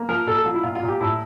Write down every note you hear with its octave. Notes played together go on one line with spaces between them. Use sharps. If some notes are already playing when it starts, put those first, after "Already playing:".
Already playing: A#3
F3 A#4
A#2 A4
A4
F3 F4
E4
A#2 F4
F4
A#2
G4
A2 E4